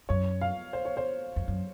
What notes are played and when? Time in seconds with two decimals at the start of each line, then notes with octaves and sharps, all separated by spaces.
0.09 F#2 C#5
0.41 F5
0.73 C5
0.85 C#5
0.97 C5
1.36 F2
1.48 F#2